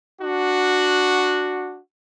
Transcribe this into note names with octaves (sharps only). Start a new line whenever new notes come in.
D4 F#4